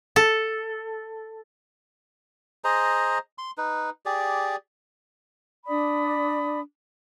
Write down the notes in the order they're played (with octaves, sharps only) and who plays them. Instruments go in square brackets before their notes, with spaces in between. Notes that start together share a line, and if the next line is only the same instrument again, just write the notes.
[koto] A4
[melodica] G#4 C5 D#5 A#5
C6
D#4 B4
G4 G#4 D5
[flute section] D4 D5 B5 D#6